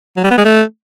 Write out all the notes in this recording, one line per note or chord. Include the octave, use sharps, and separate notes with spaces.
F#3
G3
B3
G#3
A3